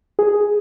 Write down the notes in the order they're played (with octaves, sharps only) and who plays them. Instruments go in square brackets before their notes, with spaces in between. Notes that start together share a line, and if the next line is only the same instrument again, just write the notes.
[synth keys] G#4